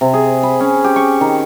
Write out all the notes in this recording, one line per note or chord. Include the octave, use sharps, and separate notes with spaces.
C3
G#4
B5
C#4
G4
C#6
D#3